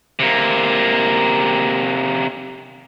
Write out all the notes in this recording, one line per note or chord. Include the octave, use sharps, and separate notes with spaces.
C3 A#3